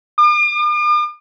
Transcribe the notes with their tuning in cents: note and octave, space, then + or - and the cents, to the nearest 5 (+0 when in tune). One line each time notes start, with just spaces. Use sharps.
D6 +45